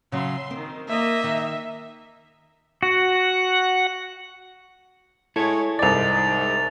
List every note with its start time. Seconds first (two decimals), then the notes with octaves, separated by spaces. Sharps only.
0.12 C#3 F#3 E5 C6
0.51 D#3 C4
0.88 A#3 D#5 E5
1.24 D#3
2.83 F#4 F#5
5.36 G#3 E4 A4 C#5
5.79 C2 G#2 D5 A6 F7